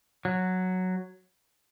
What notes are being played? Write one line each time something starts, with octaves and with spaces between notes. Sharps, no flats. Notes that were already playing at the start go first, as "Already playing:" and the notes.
F#3